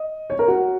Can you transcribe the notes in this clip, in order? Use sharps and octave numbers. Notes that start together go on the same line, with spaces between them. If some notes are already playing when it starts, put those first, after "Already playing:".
Already playing: D#5
C#5
A#4
F#4